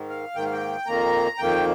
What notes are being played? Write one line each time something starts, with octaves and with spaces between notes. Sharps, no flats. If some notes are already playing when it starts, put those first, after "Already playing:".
Already playing: G#2 D#3
F5
G#2 D#3 A#3 G5
F5
G5
F2 D#3 A#3 A#5
F2 D#3 A#3 G5